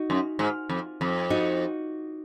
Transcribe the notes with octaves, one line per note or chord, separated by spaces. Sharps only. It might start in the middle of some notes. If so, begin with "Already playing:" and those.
Already playing: D#4 F#4
F#2
G#2
F2
F2
D#4 F#4